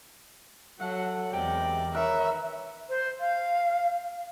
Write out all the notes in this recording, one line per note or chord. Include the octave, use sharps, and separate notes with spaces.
F#3 A4 E5 F#5
E2 C3 G#3 A#4 D5 G5
D#3 A#4 B4 C#5 E5 F#5
C5
F5